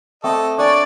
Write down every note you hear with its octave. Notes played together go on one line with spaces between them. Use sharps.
A3 C4 A4 D5 D#5
D4 C#5 D5 G#5